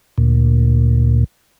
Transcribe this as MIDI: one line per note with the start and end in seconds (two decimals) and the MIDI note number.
0.18 1.24 38
0.18 1.24 46